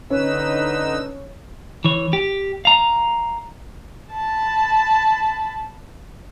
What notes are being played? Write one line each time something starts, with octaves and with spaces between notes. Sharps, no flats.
D3 C#4 D#4 B4 E6
E3 C#5
G4
F5 A#5
A5 B5